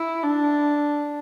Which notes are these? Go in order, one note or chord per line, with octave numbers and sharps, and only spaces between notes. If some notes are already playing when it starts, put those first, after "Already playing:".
Already playing: E4
D4